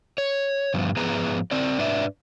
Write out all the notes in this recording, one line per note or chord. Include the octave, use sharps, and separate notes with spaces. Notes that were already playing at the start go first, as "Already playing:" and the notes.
C#5
G2 D3 F3 B3
G#2 F3 B3 G#4 B4 A#5
C4 A#4 D5
G#2 D4 B4 D5 E5